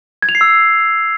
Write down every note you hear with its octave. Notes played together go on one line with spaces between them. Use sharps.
G#6
F7
C7
E6